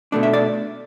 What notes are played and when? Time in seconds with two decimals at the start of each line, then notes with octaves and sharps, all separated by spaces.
0.12 B2 A3 D4
0.23 E5
0.33 D5